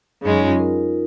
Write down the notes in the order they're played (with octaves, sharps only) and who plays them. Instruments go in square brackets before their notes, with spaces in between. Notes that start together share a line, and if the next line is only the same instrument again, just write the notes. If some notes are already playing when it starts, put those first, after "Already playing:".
[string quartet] F#2 C#3 G#3 C#4 [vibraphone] D#4
[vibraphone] F4
A#4